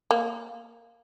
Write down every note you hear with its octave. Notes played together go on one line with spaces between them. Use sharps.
A#3